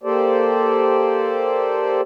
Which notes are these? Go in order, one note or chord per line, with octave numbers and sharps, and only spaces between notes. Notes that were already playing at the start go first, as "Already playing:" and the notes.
A#3 G4 A4 C5 D5